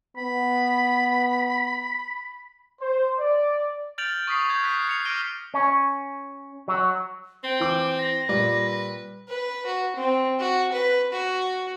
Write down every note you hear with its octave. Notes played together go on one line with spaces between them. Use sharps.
B3 B5
C5
D5
F6 G6 A6 D7 F7 F#7
C#6 D#6 B6 C7
G6 G#6
F#6 B6 C7
C7 C#7 F7
D6 F6 A#6 D7 D#7 G7
C#4
F#3
C4 G5
E3 D6 F#7
A#6
A#2 G3 B4 D5
B4
F#4
C4
F#4
B4
F#4